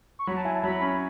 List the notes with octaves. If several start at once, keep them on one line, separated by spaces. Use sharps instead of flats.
C#6
F#3 B5
A5
E4 G#5
A5
F#3 B5
C#4